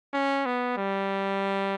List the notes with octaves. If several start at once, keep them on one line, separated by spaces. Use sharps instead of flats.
C#4
B3
G3